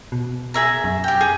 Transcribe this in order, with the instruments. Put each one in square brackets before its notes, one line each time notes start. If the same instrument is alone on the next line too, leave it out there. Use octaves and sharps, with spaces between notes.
[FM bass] B2
[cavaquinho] G#4 E5 A#5
[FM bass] F#2
[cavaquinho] G4 G5
G#4